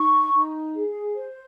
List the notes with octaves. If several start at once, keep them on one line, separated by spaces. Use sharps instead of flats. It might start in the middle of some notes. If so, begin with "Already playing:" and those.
Already playing: D#4 C#6
D#4
G#4
C5